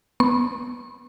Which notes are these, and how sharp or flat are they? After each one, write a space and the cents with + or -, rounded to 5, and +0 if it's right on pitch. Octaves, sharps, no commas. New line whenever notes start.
B3 +0 C#6 -45